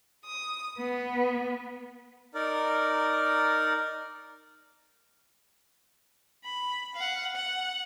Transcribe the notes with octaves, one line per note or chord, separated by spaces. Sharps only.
D#6
B3
D#4 A#4 D5
B5
F5 F#5
F#5